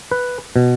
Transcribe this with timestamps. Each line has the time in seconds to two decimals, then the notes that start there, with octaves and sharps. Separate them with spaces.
0.11 B4
0.56 B2